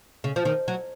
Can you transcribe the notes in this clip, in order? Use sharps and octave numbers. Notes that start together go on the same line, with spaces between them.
C#3
F3
D#3
F#3